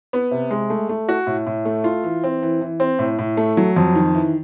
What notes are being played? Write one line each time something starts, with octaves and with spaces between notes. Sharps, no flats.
B3
C3
G#3
A3
A3
F#4
A2
A2
A3
F4
E3
C4
E3
E3
C4
A2
A2
A3
F#3
F2
D#3
E3